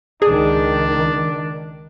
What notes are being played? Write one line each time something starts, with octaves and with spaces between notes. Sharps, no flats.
C#2 D#3 D4 G#4